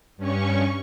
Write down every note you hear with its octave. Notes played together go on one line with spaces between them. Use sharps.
G2 C#4 C#6